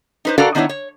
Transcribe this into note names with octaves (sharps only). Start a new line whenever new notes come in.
D#4 B4 C5
D4 F#4 A4 A#4 D5 F5
D#3 B3 D4 E4 C#5
C#5